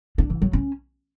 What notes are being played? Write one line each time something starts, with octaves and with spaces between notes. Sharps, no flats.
D4
E3
F#3
C#4